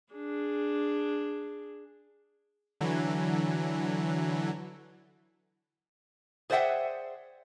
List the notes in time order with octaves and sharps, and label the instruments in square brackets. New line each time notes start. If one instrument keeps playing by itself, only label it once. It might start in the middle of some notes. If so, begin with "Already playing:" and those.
[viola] D4 G#4
[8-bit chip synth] D3 E3 F#3
[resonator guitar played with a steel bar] G#4 C5 D5 E5 F#5 G5